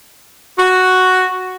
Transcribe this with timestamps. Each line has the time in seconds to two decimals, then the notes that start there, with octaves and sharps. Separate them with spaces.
0.58 F#4